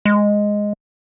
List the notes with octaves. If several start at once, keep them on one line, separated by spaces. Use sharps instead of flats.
G#3